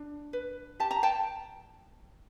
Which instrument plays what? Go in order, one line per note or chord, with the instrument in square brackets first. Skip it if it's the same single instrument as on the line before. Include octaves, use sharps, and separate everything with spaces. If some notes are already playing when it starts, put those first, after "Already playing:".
Already playing: [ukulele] D4
B4
G4 A5
A#5
G5 A5